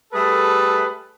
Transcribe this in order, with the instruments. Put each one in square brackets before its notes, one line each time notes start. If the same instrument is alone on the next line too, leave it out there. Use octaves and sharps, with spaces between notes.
[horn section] G3 A3 G#4 A4 B4